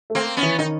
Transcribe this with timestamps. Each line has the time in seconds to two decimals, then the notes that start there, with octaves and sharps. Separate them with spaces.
0.10 A3
0.15 A#3 C4
0.37 B3 C#4
0.42 E3
0.59 D#3 D#4